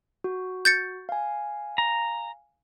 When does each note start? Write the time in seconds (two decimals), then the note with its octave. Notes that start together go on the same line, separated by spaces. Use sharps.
0.24 F#4
0.65 G6 A6 C#7
1.09 F5 G#5
1.78 A#5